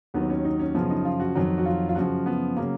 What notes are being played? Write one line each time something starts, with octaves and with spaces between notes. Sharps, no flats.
D#2 D#3 F#3 B3
C#4
D#4
C#4
F#2 C#3 F3 B3
D#4
F4
F#4
F2 D#3 F#3
F#4
F4
F4
F#2 C#3 F3 F#4
B3
C#3 F#3 A#3